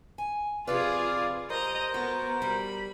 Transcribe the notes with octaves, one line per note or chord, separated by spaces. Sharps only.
G#5
F2 C3 F4 G#4 B4 D5 F5
G3 A#4 C5 D#5 A#5
B3 F#4
G3 B5